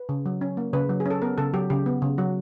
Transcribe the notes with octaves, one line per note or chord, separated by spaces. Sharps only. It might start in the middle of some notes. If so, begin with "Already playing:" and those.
Already playing: B4
C#3
F#3
C#4
A#3
C#3 B4
F#3
G#4
C#4 A4
B3 A#4
C#3 A4
F#3 G4
C#3 G4
B3
C#3
F#3 F#4